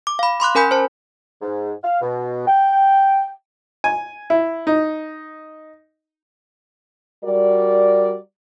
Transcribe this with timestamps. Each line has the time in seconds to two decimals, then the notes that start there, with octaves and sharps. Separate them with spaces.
0.07 D6
0.19 F5 B5
0.40 B5 C6 D6 F#6
0.55 C#4 A#4 G#5 B5 G6 B6
0.71 C5 A5
1.42 G#2
1.83 F5
2.01 B2
2.47 G5
3.84 G#5
4.30 E4
4.67 D#4
7.23 G3 F#4 A#4 D5